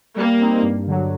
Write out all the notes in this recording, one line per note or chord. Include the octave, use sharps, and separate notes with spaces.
G3 A#3
C4 D#4
G2
D3 F#3